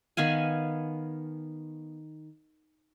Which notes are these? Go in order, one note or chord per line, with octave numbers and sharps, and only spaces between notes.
D#3 B3 F5 G#5